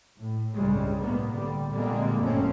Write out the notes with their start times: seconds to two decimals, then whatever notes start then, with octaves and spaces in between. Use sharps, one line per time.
0.20 A2
0.55 C2 G2 C#3 G3 G#3
1.00 A2 C3 A#3 B3
1.31 D3 G3
1.70 A#2 D3 G3 G#3 A#3 C4
2.19 G1 F#2 A#2 A3 C4 C#4